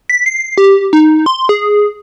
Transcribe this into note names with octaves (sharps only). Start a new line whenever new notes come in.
B6
C7
G4
D#4
C6
G#4